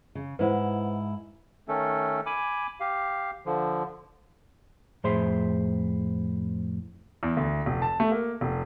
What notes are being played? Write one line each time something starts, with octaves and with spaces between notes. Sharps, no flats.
C#3
G#2 E4 B4 C5 F#5
D#3 A3 C#4 A4
G#5 B5 D6
G4 F5
D3 F3
F2 A2 G#4 C5 E5 C6
E2
D2
F1
A5
A3
A#3
F1